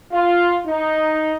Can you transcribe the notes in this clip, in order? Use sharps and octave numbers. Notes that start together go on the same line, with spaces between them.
F4
D#4